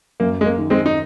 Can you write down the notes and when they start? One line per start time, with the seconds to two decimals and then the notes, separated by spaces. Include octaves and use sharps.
0.20 F#2 A#3
0.41 G#3
0.46 A#3
0.58 D#3
0.70 G#3 C4
0.86 D#4